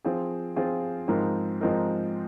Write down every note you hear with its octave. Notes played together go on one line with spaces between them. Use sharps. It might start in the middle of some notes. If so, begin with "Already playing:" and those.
F3 C4 F4 G#4
F3 C4 F4 G#4
G#2 F3 C4 D#4 A#4
G#2 F3 C4 D#4 A#4